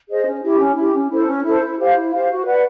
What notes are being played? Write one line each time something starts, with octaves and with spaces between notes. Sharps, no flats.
G#4 C5 D#5
C#4
E4 G4
C#4
E4 G4
C#4
E4 A4 C5
C#4
E4 A4 C5
E4
G4 C5 F5
E4
G4 C5 F5
F#4
B4 D5 F#5